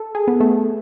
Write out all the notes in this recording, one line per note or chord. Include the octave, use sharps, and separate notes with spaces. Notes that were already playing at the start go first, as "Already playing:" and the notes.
Already playing: A4
G#4
B3
A3